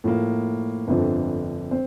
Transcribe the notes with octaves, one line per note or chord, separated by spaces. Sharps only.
A2 F3 A#3
G1 F2 D3 F3 C4
C4